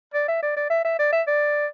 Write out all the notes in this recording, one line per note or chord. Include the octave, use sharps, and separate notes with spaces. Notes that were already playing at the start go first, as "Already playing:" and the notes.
D5
E5
D5
D5
E5
E5
D5
E5
D5